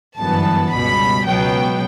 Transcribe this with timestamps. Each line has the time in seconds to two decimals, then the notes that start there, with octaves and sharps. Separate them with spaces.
0.17 G1 F#2 E3 G3 B3 A5
0.72 C#2 B2 G3 B5
1.25 C#2 B2 F#3 B3 G5